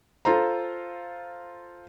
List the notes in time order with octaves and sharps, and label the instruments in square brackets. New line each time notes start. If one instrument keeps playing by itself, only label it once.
[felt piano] F4 A4 C5 A#5